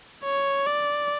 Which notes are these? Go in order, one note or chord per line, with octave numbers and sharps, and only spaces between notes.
C#5
D5